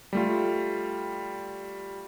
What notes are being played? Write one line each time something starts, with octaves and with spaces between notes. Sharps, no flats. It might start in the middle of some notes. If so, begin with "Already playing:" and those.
G3 A3 F4